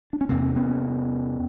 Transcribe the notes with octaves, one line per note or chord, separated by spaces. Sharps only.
D4
C#4
E2 C3 A#3 C4
B3 C#4